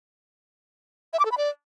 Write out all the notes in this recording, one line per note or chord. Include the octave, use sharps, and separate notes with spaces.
E5
D6
A4
B5
D5